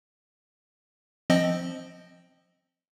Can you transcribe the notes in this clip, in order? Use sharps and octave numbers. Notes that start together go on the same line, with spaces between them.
F3 C4 D#5